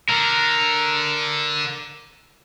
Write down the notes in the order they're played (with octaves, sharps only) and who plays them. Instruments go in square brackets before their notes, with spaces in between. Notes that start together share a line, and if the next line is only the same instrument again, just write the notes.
[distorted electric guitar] D3 [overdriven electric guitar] A#4